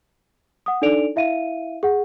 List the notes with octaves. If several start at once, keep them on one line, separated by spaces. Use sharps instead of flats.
F#5 D#6
D4 D#4 A4 D5 D7 F7
E4 E5 F5 D#7
G#4 F#5